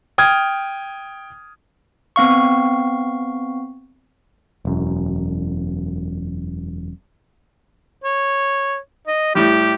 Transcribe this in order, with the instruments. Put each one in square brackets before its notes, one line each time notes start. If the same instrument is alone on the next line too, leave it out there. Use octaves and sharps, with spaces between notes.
[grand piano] G5 D#6 F6 G#6
[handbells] B3 C4 F5 C#6
[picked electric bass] E1 F#2
[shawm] C#5
D#5
[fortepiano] A2 G3 [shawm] G4